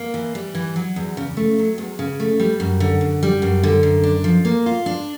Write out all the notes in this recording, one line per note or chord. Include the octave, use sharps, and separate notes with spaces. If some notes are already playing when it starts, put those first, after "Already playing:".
Already playing: A#3
E3
G3
E3
F#3
E2
C#3
A3
F#3
E2
C#3
A3
G3
F#2
D3
F#2
G3
F#2
D3
F#2
D4
F3
A#3
F4
D4